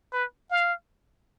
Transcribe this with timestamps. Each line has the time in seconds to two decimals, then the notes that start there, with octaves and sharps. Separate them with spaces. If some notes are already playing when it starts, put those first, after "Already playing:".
0.13 B4
0.51 F5